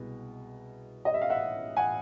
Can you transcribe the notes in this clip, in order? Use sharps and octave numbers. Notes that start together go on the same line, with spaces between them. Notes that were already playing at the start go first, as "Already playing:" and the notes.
Already playing: C2 B2 G#3 B3
D#5
E5
F5
E5 F#5
F#5 G#5